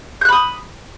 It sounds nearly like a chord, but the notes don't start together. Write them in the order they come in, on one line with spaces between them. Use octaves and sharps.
G6 F#6 B5 D#6